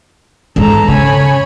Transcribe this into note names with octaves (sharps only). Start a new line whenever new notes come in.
E2 G#2 A4 A5 A#5
C#3 C#5 G#5 B5